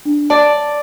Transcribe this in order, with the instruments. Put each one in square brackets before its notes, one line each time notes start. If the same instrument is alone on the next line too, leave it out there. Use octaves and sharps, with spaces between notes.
[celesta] D4
[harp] D5 [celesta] A5